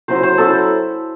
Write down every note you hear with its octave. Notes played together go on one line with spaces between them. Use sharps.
F#3 C#4 E4 C5
C5
F#3 C#4 E4 A4